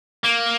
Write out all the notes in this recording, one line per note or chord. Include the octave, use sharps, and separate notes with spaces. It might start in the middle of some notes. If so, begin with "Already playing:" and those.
A#3